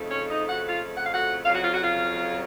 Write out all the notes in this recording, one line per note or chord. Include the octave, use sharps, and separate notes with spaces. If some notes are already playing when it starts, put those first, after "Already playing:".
Already playing: F2 C#3 A3 C4 D#4
C#4 C#5
D#4 D#5
F#4 F#5
F4 F5
F#5
F5
F#4 F#5
F2 C#3 F#3 F4 F5
F#4 F#5
F4 F5
F#4 F#5
F4 F5